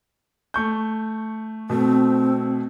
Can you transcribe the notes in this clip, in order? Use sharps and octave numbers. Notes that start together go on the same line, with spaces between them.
A3 C#6 G6
B2 A3 C4